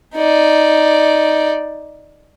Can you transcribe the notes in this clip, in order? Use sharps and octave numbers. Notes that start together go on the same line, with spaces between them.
D#4 D5